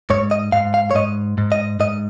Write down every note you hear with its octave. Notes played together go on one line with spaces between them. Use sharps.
G#2 C#5
D#5
G#2 F5
F5
C#5
G#2 D#5
G#2
D#5
G#2 D#5